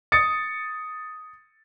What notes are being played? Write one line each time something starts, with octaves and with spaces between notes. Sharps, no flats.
D#6 A6 C#7